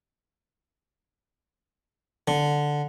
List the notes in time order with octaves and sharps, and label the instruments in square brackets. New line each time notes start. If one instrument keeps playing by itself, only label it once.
[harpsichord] D3